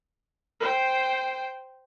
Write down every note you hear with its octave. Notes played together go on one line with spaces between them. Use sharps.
C5 G5